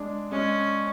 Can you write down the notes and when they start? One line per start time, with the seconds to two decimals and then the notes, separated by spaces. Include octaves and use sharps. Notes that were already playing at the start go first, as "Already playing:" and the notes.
Already playing: G#3 D4
0.31 G#3 C#4